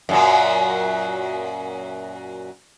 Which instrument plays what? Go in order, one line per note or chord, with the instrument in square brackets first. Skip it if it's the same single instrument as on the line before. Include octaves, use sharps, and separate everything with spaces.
[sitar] F#2 A#2 F#3